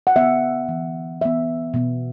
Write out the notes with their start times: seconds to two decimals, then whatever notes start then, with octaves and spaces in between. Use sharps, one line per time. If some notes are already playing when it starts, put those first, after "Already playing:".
0.07 F#5
0.16 D3 B3 E5
0.68 E3 B3
1.21 E3 B3 E5
1.74 B2 B3